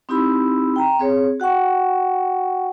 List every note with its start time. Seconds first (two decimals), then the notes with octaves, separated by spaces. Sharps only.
0.09 C4 D#4 E4 G4 B5 E6
0.76 G5 A#5
0.99 C4 G#4 C#5
1.40 F#4 F#5 G5 C#6